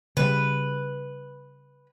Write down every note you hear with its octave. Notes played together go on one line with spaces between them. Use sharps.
C#3 G3 B4